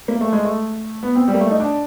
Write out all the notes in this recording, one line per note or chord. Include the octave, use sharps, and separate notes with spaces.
A#3
A3
G#3
A3
B3
C4
G3
A#3
A3
D#4
D4